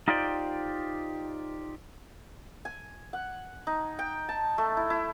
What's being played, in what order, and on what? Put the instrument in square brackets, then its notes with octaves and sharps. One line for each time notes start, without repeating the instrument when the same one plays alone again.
[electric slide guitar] D#4 F4 G4 C5 D5 G5
[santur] G#5
F#5
D#4
G5
A5
A3
E4
E4